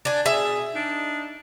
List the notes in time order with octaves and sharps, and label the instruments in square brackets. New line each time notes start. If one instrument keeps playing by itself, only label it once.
[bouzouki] D4 G#5
[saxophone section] B2 G#4 [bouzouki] E5
[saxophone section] D4 D#4